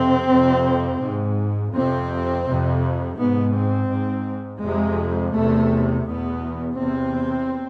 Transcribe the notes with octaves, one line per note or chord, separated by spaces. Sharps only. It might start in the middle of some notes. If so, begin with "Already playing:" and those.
Already playing: F2 C3 C4
F2 C3
G#2
F2 C3 C4
F2 C3
G#2 B3
C4
G#2
F2 C3 G#3
E2 C3 A3
E2 B2 B3
E2 C3 C4